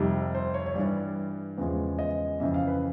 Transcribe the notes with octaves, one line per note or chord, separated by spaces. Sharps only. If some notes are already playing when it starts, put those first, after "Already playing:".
Already playing: F2 C3 D#3 G3
C5
C#5
C#5
G2 E3 G3 D5
E2 C#3 F3 G#3
D#5
F2 C#3 E3 E5
F5
B4